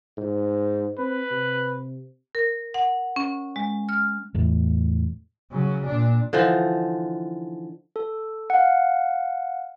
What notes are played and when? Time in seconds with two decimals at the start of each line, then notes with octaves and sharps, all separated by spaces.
0.18 G#2
0.98 C4 B4
1.31 C3
2.35 A#4
2.74 F#5
3.16 C#4
3.56 G#3
3.89 F6
4.34 E2 A2
5.51 C#3 F#3
5.86 A#2 D4
6.33 D3 E3 F3 D#4
7.96 A4
8.50 F5 F#5